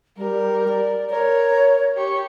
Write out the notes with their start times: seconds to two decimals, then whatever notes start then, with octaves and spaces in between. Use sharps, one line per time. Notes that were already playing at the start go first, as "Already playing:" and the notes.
0.18 G3 A#4
0.68 D5
1.10 A#4 C#5 A#5
1.97 G4 C#6